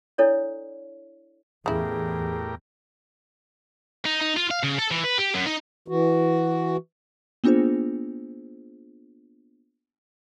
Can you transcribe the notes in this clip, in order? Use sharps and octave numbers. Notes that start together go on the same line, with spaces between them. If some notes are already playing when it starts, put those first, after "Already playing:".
D4 E4 A4 C#5 D5
E2 A2 C#3 E4 G4 G#4 A#4
D#4
D#4
F4
F5
C#3
A4
E3
B4
G4
F#2
D#4
E3 F#4
A#3 B3 D4 F4 G#4 C5